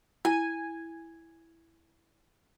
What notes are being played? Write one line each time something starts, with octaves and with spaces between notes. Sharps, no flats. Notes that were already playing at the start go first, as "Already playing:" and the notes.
E4 G#5